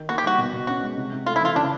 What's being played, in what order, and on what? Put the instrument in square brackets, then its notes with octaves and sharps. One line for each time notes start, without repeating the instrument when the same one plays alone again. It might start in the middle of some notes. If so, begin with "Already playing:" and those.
Already playing: [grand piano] D#3 D#4
[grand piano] A#3 [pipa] F#4
[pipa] G4
[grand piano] G3 [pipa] F#4
[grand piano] B2
B2
[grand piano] C#4 [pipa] F#4
[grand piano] G#3
C3
C3
[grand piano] A3 [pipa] F4
[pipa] E4
[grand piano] E3 [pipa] F4
[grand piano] C#3 [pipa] D4